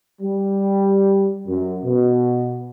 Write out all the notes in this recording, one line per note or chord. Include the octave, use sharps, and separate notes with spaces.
G3
F#2
B2